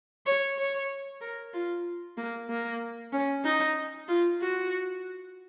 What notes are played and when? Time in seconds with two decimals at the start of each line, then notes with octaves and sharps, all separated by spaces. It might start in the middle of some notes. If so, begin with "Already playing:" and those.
0.26 C#5
0.58 C#5
1.21 A#4
1.53 F4
2.17 A#3
2.49 A#3
3.12 C#4
3.44 D#4
4.08 F4
4.41 F#4